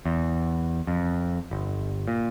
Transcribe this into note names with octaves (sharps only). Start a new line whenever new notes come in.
E2
F2
G1
A#2